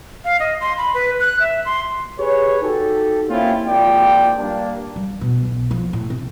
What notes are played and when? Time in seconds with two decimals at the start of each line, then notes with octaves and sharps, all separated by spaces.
0.25 F5
0.40 D#5
0.61 C6
0.78 B5
0.94 B4
1.20 F#6
1.40 E5
1.65 C6
2.20 G4 G#4 B4 C#5
2.62 D#4 F#4 G4 A4
3.29 A#3 C4 C#4 E4 F4 G4
3.67 G#1 A#2 F3 D5 G5
4.38 G2 A#3 D4
4.96 G3
5.21 B2
5.45 B1
5.71 F3
5.93 A2
6.10 C3